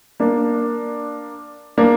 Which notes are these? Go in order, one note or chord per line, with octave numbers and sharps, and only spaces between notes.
A#3 D4
A#3 D4